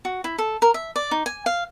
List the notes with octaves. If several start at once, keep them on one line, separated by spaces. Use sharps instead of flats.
F#4
E4
A4
A#4
E5
D5
D#4
G#5
F5